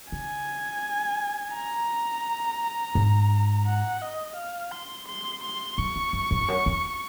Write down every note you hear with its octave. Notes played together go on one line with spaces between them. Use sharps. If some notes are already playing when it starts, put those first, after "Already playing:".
C#3 G#5
A#5
G#2
F#5
D#5
F5
C6
C6
C6
F#2 C#6
F2
F#2
F#2
F2
F#2
F2